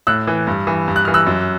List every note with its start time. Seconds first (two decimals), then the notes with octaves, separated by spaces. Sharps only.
0.07 A2 E6 F#6
0.27 E3
0.47 G2
0.67 E3
0.88 G2
0.96 F#6
1.05 E3 F6
1.14 E6 F#6
1.27 F#2